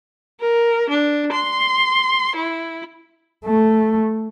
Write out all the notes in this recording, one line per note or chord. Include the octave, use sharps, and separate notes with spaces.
A#4
D4
C6
E4
A3